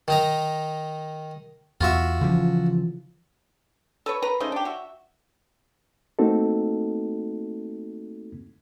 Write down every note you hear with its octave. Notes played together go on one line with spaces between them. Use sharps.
D#3 D#4 A#5
E2 F4 F#4 E5
C#3 E3 F3
A4 B4 C#5
A#4 B4 A#5
C#3 A3 D#4 C5
D4 G4
F#4 E5
A3 A#3 C4 D#4 F#4 A4